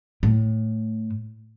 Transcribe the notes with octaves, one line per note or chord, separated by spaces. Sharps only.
A2